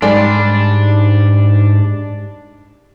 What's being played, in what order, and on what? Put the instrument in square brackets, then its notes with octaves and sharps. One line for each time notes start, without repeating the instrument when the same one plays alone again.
[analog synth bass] G#2 [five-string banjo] G3 G#3 [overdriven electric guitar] D4